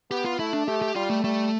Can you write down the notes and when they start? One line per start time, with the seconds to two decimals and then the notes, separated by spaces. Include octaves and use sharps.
0.11 B3 G4
0.25 F4
0.39 A3 E4
0.53 D4
0.67 A3 G4
0.82 G4
0.95 G3 F4
1.10 A3
1.24 G3 A3